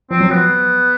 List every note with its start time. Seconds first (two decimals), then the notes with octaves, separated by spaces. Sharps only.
0.11 F3 C4
0.21 F#3
0.30 F3 B3